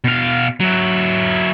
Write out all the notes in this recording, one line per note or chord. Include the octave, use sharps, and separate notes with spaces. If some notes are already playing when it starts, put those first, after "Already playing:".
B2 F5
F#3 E4